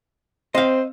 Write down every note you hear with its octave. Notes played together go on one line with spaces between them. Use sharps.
C4 C5 D#5 F5